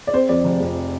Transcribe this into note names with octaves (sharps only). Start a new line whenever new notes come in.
D5
C4 C5
F2 D5
F1
F2